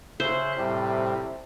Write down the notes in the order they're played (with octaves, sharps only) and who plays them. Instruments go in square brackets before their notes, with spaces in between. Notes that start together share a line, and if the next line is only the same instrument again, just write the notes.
[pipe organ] C#3 E5 F#6 [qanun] C5
[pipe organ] A2 G3 [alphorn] C3